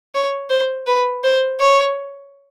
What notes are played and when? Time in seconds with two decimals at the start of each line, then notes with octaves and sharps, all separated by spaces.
0.15 C#5
0.50 C5
0.87 B4
1.24 C5
1.60 C#5